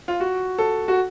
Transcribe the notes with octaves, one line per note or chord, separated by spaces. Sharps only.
F4
F#4
A4
F#4